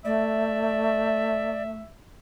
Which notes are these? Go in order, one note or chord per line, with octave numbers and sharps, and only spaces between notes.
A3 D5 E5